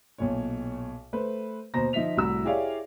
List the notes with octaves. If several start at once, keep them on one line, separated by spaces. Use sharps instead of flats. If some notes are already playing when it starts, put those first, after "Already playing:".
B1 A#2 C#5
A3 B4 C5
D#2 B2 C5 A#5 A#6
F3 D#4 E5 B6 F7
C2 A2 F#4 A#5 E6
E4 G4 G#4 C#5 D5 F5